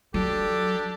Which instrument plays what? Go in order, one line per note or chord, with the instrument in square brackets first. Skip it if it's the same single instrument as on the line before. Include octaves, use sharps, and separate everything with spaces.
[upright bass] F#3 [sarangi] D4 [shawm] G4 [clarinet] A4